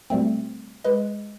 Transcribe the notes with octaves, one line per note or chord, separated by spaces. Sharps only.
B2 G3 A3 C4
G#3 B4 D#5